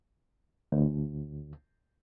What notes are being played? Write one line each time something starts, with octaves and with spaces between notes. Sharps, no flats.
D2